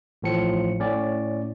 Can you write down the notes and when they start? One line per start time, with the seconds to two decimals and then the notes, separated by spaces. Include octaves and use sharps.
0.22 A1 A2 F3 C#7
0.79 A2 C#4 D5